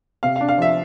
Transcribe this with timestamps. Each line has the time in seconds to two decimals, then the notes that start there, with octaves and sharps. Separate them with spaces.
0.23 C3 F5
0.36 F5
0.41 D4
0.49 F5
0.58 F3 E5